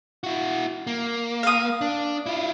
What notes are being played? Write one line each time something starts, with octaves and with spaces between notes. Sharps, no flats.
E4 F#4
A#3
F5 D#6
D4
E4 F4